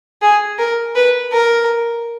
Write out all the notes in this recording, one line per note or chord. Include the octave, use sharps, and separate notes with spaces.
G#4
A#4
B4
A#4